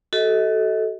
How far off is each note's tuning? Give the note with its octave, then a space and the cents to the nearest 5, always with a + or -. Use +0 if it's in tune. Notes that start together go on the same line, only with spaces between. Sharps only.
F#4 +35 A4 +0 D#5 +35